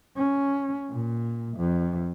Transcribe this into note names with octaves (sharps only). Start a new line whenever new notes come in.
C#4
A#2
F2